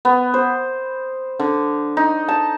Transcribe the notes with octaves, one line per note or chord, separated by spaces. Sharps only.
B3
C5
D3
D#4
A5